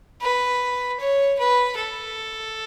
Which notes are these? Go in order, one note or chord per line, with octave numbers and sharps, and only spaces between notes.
B4
C#5
B4
A4